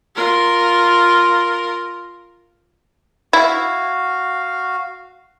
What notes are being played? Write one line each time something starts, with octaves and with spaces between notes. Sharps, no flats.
F4 A#4
E4 F#4 F5